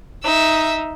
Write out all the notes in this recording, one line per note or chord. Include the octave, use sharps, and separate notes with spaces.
D#4 E5 E6